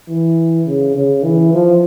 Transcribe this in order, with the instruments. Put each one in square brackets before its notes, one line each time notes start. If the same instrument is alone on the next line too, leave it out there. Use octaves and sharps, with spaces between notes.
[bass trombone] E3
C#3
C#3
E3
F3